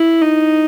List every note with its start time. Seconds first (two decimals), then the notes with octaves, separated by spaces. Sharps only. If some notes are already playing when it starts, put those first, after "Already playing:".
Already playing: E4
0.22 D#4